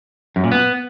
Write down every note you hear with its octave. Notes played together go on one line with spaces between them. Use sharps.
F#2
A#2
B3